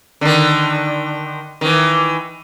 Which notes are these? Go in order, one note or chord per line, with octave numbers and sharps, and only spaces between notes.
D3 D#3
D#3 E3